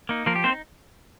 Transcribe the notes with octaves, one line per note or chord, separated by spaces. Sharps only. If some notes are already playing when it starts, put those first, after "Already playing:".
A#3 D#4
F3 A#3 A#4
G4
A#3 C4 D#4 C5